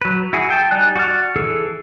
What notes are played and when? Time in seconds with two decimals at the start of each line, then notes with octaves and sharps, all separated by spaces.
0.01 F#3 B4
0.33 E4 F#4 G#4
0.49 G#4 G5 A5
0.71 G3 D#4 D5 G#5 F#6
0.96 F#4 D5 C6 F6
1.36 E3 G#4 A4